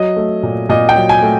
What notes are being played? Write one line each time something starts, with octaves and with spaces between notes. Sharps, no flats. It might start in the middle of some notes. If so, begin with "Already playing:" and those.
Already playing: F#3 D#5
A3
A#2
A#2 D#5
G5
F#3
G#5
A3